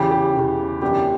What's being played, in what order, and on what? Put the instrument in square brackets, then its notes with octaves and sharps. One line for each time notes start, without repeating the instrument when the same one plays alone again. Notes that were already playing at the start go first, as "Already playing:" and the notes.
Already playing: [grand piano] E2 C#3 E3 G4
G4
E2 C#3 E3
F#2 E3 B3 D4 G4